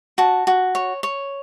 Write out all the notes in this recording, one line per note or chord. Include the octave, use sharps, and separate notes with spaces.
F#4 A5
F#4
C#5
C#5